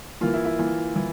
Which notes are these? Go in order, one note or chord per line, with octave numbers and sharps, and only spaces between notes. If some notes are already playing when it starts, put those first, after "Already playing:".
E3 A#3 F4
E4
E4
E3 A#3 F4
E3